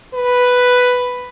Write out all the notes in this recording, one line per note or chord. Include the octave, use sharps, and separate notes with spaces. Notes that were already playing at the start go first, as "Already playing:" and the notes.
B4